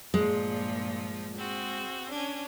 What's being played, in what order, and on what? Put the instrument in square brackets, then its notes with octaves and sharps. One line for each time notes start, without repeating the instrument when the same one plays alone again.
[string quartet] G2 A#2 F3 [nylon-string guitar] G#3
[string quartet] C4 F#4 G#4
C#4 D4